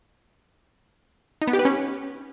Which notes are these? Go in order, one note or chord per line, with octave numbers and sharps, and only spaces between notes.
D#4
B3
G4
B4
C#4